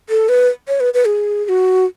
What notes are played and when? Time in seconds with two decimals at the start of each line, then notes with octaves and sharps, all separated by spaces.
0.09 A4
0.29 B4
0.68 C#5
0.80 B4
0.94 B4
1.06 G#4
1.45 G#4
1.49 F#4